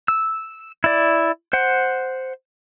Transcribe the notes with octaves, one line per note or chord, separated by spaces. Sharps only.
E6
E4 D5
C5 F#5